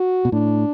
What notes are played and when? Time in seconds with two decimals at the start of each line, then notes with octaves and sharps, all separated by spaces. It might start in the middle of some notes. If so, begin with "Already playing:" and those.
Already playing: F#4
0.25 B2
0.32 A2 D4